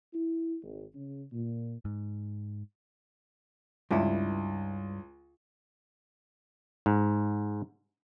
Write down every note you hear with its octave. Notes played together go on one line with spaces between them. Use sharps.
E4
G#1
C#3
A#2
G#2
C#2 G2 E4
G#2